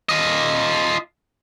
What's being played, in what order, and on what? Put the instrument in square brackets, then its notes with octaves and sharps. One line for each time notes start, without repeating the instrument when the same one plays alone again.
[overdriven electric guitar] F4 D#5